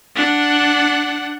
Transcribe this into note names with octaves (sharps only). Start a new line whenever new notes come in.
D4 F#5